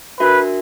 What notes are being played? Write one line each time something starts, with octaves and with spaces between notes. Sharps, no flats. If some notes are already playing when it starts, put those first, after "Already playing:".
D4 F#4 A#4 B4 E5